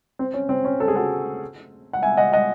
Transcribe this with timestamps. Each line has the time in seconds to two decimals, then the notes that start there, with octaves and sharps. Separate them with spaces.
0.19 C4
0.34 C#4
0.49 C4
0.65 C#4
0.80 A4
0.88 G#4
0.95 F#4 A4
1.93 F#5
2.02 E5 G#5
2.17 D#5 F#5
2.33 D#5 F#5